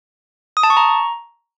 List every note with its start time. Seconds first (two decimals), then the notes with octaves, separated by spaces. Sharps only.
0.57 D#6
0.63 A5
0.70 C#6
0.77 A#5